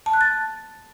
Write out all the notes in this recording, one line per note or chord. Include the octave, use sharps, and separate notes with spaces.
A5
F#6
A6